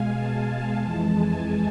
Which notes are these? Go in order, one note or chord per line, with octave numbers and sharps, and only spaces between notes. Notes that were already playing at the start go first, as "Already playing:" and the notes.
Already playing: B2 G#3 F5 G#5
A5
A5
F2 E3 G#3 A5
G#5